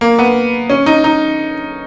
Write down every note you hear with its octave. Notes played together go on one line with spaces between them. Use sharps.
A#3
B3
C#4
D#4
D#4